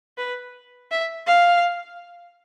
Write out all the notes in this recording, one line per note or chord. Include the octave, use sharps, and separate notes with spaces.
B4
E5
F5